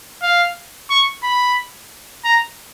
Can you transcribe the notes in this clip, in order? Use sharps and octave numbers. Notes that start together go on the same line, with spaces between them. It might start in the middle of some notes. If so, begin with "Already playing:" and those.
F5
C#6
B5
A#5